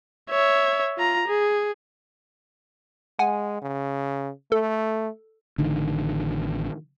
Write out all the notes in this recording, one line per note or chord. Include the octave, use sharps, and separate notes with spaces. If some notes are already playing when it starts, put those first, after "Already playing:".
C#5 E5
F4 A#5
G#4
G#3 F#5 G#5
C#3
A3 A4
A1 D3 D#3